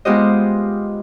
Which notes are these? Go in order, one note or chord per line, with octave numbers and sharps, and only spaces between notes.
G#3 B3 F4 G4 C5 D#5